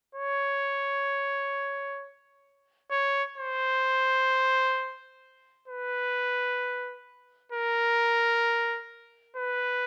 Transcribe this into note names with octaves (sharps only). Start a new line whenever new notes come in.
C#5
C#5
C5
B4
A#4
B4